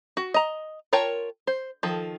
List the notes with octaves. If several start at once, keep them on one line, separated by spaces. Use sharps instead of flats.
F#4
D#5 A#5
F4 A#4 C#5 G5 A5
C5
D#3 F3 A4